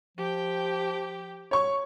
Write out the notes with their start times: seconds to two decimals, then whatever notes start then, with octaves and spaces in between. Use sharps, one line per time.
0.18 F3 G4 G5
1.51 C#5 C#6